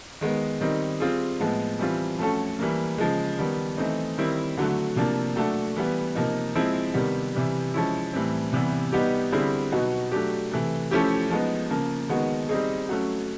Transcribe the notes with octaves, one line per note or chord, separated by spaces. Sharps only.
D#3 G#3 B3
D#3 G3 C4 D#4
G3 C4 F4 G#4
A2 F3 G#3 B3
E3 G3 C4 F4
F3 A3 C#4 F#4 A4
E3 G3 A#3
C#3 F3 G#3
D#3 G3 B3
E3 A3 C4 D#4
D#3 G3 C4 E4
D3 F#3 A3
C3 F3 A#3 D4
F#3 A3 D4 F#4 A4
E3 G3 B3
C3 F3 A#3 D#4
F3 G#3 C4 E4
C3 D#3 G3 B3
C3 E3 G3
F3 G#3 C#4 E4
A2 E3 G3 C4
C3 E3 G3 B3
G3 B3 D#4 G4
D3 G3 C4 E4 G#4
B2 F#3 B3 D#4 F#4
F#3 A3 D4 G4
C3 E3 A3
F3 A3 C#4 E4 G4
F3 G#3 B3 D#4
C#3 F3 A#3
D#3 G#3 B3 D#4 F#4
G3 C4 D#4 G#4
F#3 A3 C#4